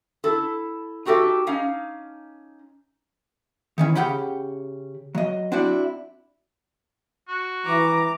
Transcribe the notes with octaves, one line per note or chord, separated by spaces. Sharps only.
E4 A4
D#4 F#4 G4 A4 E5
C#4 D#4 F5
D#3 E3 C#4
C#3 C#4 G4 F#5 G5 B5
F#3 D#5
C4 D4 E4 F#4 D5
F#4
E3 A#5 D6